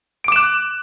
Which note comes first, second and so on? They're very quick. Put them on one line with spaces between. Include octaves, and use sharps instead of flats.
D7 D6 E7 F#6